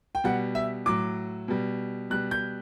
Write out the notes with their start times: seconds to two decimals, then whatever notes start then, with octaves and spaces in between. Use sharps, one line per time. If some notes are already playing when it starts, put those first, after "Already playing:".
0.15 G5
0.24 B2 G3 F#5
0.55 E5
0.86 A2 F#3 D6
1.48 B2 G3
2.10 B2 G3 F#6
2.31 G6